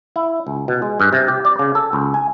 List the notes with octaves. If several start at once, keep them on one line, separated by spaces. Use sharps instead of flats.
E4
C#2
B2
G#3
G2
C3
G4
D5
C#3
A4
C#2
G#5